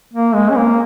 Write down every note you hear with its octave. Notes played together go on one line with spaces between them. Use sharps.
A#3
G#3
C#4
A#3